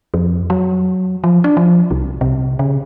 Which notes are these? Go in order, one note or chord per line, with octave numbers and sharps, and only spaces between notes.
F2
F#3
F3
D4
F3
C2
C3
C#3